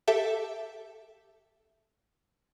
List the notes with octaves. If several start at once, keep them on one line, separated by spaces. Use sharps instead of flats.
G4 A4 E5